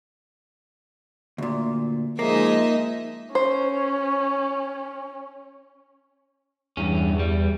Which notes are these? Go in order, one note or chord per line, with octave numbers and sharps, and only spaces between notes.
D2 A#2
F3 G#3 A#3 D#4 D#5 E5
C#4 C5
E2 G2 C#4
G3